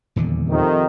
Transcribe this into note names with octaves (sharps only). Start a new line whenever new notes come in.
D#1 E2 D3
F2 C3 D#3